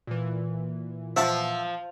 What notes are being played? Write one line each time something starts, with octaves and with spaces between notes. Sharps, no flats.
A#2 E3
F3 E5 F#5 C#6